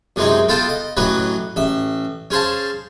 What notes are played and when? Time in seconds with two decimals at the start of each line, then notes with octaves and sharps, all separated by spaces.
0.16 F#2 C3 E3 G#3 C4 D#4
0.48 B3 F4 A4 F5 G5 A5
0.69 D#5
0.97 A1 E3 F#3 B4 D#5
1.56 A1 E5
2.31 C#4 G#4 C5 F5 A5